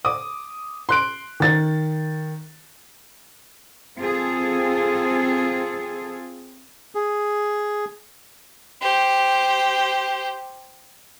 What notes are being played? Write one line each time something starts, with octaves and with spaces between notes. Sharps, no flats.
D6 D#6
C6 F#6 D7
D#3 A6
C4 F4 G#4 A4
G#4
G4 C5